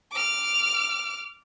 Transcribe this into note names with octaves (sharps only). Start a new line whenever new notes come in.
D6 F6